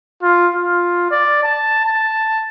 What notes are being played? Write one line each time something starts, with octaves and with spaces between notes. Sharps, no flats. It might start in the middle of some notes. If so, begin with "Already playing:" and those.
F4
F4
D5
A5
A5